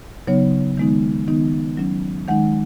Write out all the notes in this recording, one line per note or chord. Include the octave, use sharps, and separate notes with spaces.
C#3 F#3 B3 D#4 C#5
D#3 G#3 B3 D#4
D#3 B3 D#4
F#3 C#4
D#3 G#3 D#4 F#5